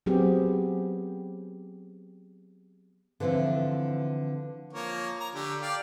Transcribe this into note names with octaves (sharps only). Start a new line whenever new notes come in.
F#3 B3 C4 G4 G#4
D3 E3 F3 C4 E4
F3 A#3 C#5
A#5
D3 G4
D5 F5 G5